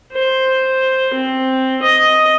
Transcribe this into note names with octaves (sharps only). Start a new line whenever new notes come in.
C5
C4
D#5